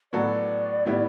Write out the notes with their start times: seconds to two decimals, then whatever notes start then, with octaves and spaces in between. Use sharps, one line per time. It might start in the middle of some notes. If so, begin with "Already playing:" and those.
0.13 A2 F#3 B3 F#4 A4 D5
0.85 A2 G3 B3 E4